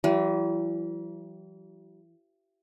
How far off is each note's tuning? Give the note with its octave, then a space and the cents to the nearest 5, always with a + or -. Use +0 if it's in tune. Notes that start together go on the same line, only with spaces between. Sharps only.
E3 +30 G3 -40